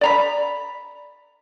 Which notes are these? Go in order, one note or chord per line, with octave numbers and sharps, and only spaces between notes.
D5 A#5 B5